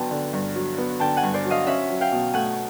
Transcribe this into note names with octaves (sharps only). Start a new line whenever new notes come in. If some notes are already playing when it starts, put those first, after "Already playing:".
Already playing: G2 D3 F#3 B3 G5 A5 C6
D3
G2
F#3
B3
D3 G5 A5
F#5 G#5
G2
C5 D5
F#3
D#5 F5
C#4 E5 F#5
F#3
F5 G5
B2
A3 F#5 G#5